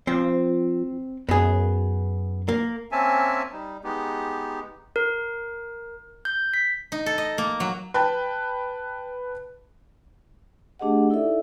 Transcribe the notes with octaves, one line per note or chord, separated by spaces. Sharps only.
F3 C4
F#2 B3 G#4
A#3
A#3 C4 C#4 E5 G#5 A5
G3 D#4
G#3 B3 D#4 G4
A#4
G6
B6
D#4
A4
D#5
A#3
F#3
B4 G5 A5
A3 D4 G4 G#4 D#5 F#5
D#4 E4 A4 D5 E5